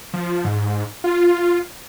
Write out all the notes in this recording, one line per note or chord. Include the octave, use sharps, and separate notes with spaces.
F3
G#2
F4